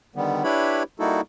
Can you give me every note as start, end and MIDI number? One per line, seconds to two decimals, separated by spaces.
0.16 0.43 50
0.16 0.43 51
0.16 0.43 55
0.16 0.43 59
0.44 0.83 62
0.44 0.83 64
0.44 0.83 67
0.44 0.83 71
0.44 0.83 73
0.44 0.83 83
1.00 1.21 55
1.00 1.21 58
1.00 1.21 63
1.00 1.21 64
1.00 1.21 66
1.00 1.21 69